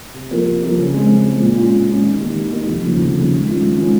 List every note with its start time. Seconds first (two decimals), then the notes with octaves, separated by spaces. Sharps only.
0.14 C3
0.31 F3 A#3 F4 A#4
0.46 C3
0.61 F3 A#3 F4 A#4
0.77 C#3
0.94 G#3 C4
1.09 C#3
1.25 G#3 C4
1.40 A#2
1.57 G#3 C#4 F4
1.72 A#2
1.89 G#3 C#4 F4
2.04 D#3
2.20 A#3 D#4 G4
2.36 D#3
2.51 A#3 D#4 G4
2.67 F1
2.83 D#2 C#3 F3
2.99 F1
3.14 D#2 C#3 F3
3.30 G#2
3.46 D#3 G#3 C#4 F4
3.62 G#2
3.77 D#3 G#3 C#4 F4